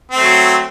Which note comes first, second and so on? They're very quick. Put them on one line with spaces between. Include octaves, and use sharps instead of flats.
C4 A3 F#3